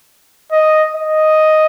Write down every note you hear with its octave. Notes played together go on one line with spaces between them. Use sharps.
D#5
D#5